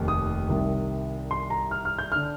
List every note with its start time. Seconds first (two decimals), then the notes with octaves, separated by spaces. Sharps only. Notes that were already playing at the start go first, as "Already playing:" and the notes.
Already playing: F1 D#2
0.08 D#6
0.48 C2 C3 D#3
1.31 C6
1.50 A#5
1.71 F6
1.85 F6
1.99 G6
2.12 D3 F6